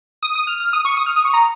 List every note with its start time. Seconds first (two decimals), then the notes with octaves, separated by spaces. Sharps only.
0.23 D#6
0.35 D#6
0.47 F6
0.60 F6
0.73 D#6
0.85 C#6
0.97 D#6
1.06 F6
1.16 D#6
1.25 C#6
1.33 A#5